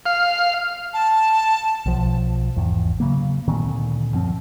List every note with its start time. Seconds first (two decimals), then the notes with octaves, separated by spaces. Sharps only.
0.06 F5
0.93 A5
1.86 B1 F3
2.56 G#1 E2
3.00 C#3 F#3 A#3
3.48 D2 A#2 D#3 C4
4.14 F#2 F3 C4